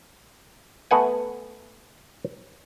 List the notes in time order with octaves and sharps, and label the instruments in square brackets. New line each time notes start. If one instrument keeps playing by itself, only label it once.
[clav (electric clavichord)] A3 B3 F#5 G#5